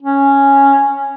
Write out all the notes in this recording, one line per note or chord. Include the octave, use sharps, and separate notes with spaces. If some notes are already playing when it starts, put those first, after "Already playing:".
C#4